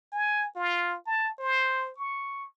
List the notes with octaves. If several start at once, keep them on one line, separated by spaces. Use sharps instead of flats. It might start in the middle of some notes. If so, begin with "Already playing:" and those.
G#5
F4
A5
C5
C#6